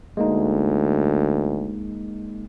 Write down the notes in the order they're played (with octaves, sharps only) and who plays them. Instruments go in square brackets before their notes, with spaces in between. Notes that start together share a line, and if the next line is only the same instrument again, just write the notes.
[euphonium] D2 [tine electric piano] G#3 A#3 D#4